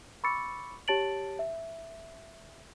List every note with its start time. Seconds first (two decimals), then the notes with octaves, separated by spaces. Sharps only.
0.24 B5 C#6 D6 E6 A6 C#7
0.88 G4 C#5 A5 A6 D7 F#7
1.39 E5